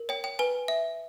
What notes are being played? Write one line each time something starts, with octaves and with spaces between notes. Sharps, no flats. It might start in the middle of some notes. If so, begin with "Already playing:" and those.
Already playing: A#4
C#5 G5
G5
B4 G#5
E5